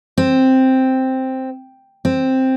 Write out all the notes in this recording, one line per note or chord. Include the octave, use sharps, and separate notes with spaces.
C4
C4